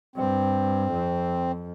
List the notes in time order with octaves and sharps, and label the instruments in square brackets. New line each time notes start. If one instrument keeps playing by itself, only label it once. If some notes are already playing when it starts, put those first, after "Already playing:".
[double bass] G2 [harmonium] C4
[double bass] F2